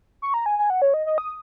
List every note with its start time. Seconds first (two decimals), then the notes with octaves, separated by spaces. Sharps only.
0.22 C#6
0.34 A#5
0.46 G#5
0.59 G#5
0.70 F#5
0.82 C#5
0.94 D#5
1.06 D#5
1.18 D#6